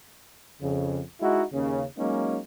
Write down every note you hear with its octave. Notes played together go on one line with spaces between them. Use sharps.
F2 C#3
G#3 D#4 E4 F#4
D#2 C#3
F#3 G#3 A#3 C#4 D#4